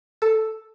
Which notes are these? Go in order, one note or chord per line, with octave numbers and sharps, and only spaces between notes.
A4